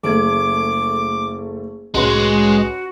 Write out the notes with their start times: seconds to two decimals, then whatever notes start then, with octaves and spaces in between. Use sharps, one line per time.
0.03 F#1 A3 G#4 D6 G#6
1.95 C2 A2 G#3 C#4 F#4 B4 C6